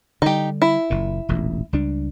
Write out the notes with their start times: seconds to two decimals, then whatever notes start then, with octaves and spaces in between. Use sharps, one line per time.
0.22 D3 G3 D#4 G4
0.62 E4
0.90 F#1 A#2
1.29 E1 A1 A#2
1.73 C#2 G3 D4